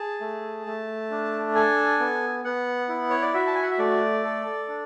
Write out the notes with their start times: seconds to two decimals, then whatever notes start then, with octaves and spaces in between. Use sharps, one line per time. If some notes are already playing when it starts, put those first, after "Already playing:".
Already playing: G#4 A5
0.21 A3
0.66 A3
1.11 D4
1.55 A4 G#5
2.00 B3
2.44 B3 F#5
2.89 E4
3.10 C#5
3.22 D5
3.34 F#4 E5
3.47 A5
3.55 G#5
3.63 F#5
3.70 E5
3.78 A3 D5
4.24 A4
4.68 D4